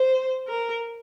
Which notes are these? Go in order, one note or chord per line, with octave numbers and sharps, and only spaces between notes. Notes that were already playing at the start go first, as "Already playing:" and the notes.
Already playing: C5
A#4